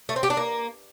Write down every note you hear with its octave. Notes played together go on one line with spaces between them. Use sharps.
A3
C4
G4
D4
A#3